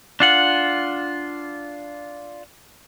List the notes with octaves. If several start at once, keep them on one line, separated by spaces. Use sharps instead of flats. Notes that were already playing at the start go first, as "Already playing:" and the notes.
D4 F4 F#5